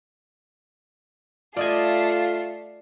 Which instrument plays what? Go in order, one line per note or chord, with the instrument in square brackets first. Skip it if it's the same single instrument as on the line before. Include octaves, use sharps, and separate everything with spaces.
[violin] A3 C7 [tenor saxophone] F4 [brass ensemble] A4 F5 [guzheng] D5 D#5 G#5